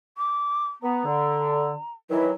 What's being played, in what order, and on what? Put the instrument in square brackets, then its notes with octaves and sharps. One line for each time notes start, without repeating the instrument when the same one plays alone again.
[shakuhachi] D6
[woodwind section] B3 [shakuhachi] A#5
[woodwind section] D3
[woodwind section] D#3 E3 F#3 [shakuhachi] E4